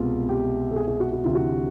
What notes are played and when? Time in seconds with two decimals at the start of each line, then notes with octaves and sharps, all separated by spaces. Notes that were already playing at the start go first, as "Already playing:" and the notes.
Already playing: C2 B2 G#3 B3 F4
0.29 G4
0.71 A4
0.76 G#4
0.88 G#4
1.00 F#4
1.12 F#4
1.24 D2 C3 E3 F4
1.35 F#4